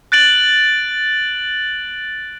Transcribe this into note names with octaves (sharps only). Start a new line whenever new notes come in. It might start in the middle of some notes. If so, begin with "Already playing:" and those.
F#6 A6 D7 F#7